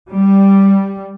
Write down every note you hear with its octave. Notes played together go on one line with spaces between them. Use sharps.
G3